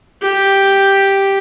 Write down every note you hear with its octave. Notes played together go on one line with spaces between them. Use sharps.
G4